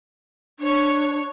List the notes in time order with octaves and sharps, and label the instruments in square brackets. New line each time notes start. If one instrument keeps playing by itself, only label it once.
[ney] D4 [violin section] C#5